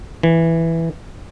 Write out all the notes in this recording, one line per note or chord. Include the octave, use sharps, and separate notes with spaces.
E3